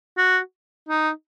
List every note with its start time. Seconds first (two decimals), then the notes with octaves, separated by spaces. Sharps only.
0.18 F#4
0.89 D#4